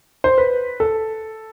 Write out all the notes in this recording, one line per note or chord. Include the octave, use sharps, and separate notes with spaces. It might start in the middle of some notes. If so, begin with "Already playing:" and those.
C5
B4
A4